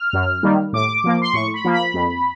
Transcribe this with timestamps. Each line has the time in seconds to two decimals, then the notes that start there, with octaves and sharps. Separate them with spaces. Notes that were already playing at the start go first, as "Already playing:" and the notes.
Already playing: F6
0.13 F#2
0.43 D#3 G3 A#3
0.73 A2 D6
1.04 F3 A#3
1.22 C6
1.33 A2 C#6
1.54 B5
1.64 F3 A#3
1.74 B5
1.94 F2